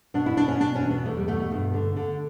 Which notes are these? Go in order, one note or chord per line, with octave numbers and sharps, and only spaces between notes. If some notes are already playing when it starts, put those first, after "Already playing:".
B2 D4
E4
B2 D4
C#4
B2 D4
C#4
E2
B3
E2 A3
G3
B2 A3
A3
G2
D3
D3